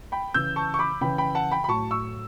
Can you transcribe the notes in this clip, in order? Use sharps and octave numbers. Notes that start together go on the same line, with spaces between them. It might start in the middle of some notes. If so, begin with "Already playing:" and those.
G5 B5
C#3 E3 E6 G6
A5 C#6
C#6
B5 D6
C#3 E3 G5 B5
G5 B5
F#5 A5
G5 B5
B5
A2 F#3 A5 C#6
C#6 E6